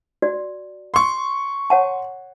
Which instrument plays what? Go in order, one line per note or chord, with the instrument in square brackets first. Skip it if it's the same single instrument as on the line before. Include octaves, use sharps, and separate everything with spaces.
[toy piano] F#4 D5
[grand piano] C6 C#6
[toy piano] C#5 F#5 A5